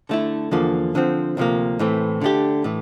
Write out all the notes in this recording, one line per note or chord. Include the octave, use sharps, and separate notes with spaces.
D3 A3 E4
E2 D3 F3 A#3
D3 F3 C4
D2 C3 F3 A#3
A2 E3 A3 C4
D3 A3 D4 G4
A2 E3